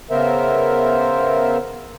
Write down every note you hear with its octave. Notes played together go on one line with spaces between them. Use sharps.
C#3 B3 A#4 C5 E5